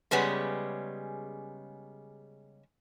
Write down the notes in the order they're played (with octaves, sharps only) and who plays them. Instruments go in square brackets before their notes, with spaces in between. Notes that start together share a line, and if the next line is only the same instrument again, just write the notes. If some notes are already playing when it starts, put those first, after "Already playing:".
[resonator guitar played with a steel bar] C#3 G3 G#3 B3 C#4